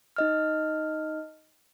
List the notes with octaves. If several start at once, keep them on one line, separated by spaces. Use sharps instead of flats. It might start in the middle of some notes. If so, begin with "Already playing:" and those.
D#4 D#5 F6